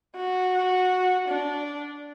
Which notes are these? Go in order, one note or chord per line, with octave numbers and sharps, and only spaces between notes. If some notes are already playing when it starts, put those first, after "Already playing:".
F#4
D4